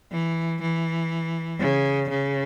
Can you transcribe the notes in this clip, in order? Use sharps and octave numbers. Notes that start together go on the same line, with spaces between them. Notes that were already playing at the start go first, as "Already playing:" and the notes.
E3
E3
C#3
C#3